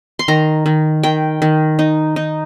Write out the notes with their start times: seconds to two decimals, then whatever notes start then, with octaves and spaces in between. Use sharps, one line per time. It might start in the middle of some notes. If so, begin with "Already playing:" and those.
0.19 C6
0.28 D#3 A#5
0.66 D#3
1.03 D#3 G5
1.42 D#3
1.79 D#4
2.16 D#4